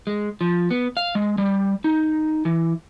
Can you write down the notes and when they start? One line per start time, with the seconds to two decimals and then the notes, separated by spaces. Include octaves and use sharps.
0.07 G#3
0.41 F3
0.71 B3
0.97 F5
1.15 G#3
1.38 G3
1.84 D#4
2.45 E3